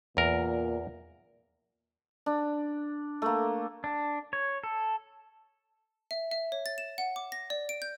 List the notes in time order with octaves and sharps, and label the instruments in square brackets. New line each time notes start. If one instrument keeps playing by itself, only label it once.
[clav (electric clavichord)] E2 A#4 [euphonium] A#2
[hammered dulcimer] D4
A3 A#3
[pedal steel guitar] D4
C#5
A4
[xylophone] E5
E5
C#5
A6
E7
F#5
D6
A#6
D5
D7
G6